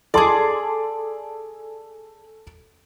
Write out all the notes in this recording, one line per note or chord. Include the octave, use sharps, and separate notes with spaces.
G#4 A4 D5 A5 C6